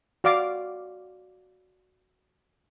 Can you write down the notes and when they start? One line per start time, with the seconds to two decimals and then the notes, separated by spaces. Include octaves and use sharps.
0.24 F#4 D5 F5 D6